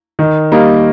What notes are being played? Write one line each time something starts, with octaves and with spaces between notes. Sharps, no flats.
D#3
G3 A#3 D#4